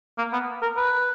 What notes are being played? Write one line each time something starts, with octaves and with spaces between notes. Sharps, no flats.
A#3
B3
A#4
B4